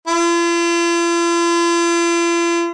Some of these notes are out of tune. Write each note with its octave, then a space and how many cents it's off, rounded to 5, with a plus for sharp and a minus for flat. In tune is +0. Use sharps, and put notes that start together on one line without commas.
F4 -45